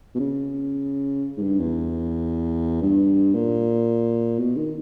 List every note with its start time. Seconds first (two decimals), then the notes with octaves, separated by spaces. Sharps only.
0.15 B2
0.20 C#3
1.37 G#2
1.42 G2
1.59 E2
2.82 G2
3.35 A#2
4.39 B2
4.57 D#3